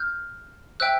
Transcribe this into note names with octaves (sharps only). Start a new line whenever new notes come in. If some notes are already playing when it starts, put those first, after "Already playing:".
Already playing: F6 G6
C5 E5 G5 E6 F#6